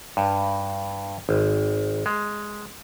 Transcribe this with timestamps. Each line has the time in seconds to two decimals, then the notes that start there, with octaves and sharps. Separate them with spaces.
0.17 G2
1.29 G#1
2.06 G#3